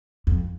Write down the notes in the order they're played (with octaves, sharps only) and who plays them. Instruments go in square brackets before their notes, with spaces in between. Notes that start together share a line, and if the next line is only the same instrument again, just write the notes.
[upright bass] F2